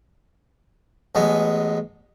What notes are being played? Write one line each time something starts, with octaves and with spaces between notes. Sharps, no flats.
A1 G#3 B3